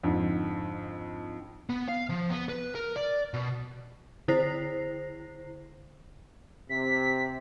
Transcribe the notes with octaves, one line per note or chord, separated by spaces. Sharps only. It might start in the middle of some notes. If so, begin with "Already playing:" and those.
F2 G#2 D3
B3
F5
F3
B3
B4
A#4
D5
B2
D3 E4 C5 A#6 C7
C3 B6